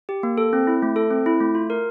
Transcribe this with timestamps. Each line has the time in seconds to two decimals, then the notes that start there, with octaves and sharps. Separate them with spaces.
0.09 G4
0.23 A#3
0.38 A4
0.53 C4
0.67 E4
0.82 A3
0.96 A4
1.11 C4
1.26 E4
1.41 A3
1.55 F4
1.70 A#4